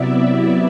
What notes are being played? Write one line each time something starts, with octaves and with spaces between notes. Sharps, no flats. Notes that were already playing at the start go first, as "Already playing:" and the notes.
Already playing: C3 F#3 B3 E4 D5 E5